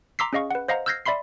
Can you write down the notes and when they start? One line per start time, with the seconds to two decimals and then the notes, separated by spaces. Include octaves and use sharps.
0.19 A#5 C6 D6 E6 B6 C7
0.33 C#4 G#4 D#5 F5 C#6
0.51 B4 F#5
0.68 C5 D#5 F5 F#5 A#5
0.86 E6 F6 G6 G#6 A#6 C7
1.06 D5 E5 B5 C6 C7